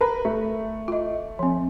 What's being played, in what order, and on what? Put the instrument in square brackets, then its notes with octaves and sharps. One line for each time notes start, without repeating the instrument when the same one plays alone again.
[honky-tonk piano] A#4 B4
A3
[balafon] F4 D#5
F3 C4